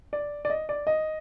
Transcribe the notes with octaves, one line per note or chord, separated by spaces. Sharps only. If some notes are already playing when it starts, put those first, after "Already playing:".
D5
D5
D#5
D5
D#5